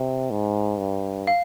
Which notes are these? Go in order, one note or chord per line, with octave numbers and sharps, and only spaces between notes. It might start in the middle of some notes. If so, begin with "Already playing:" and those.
Already playing: C3
G#2
G2
F5